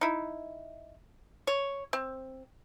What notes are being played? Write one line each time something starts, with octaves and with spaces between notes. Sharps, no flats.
D#4 E4
C#5
C4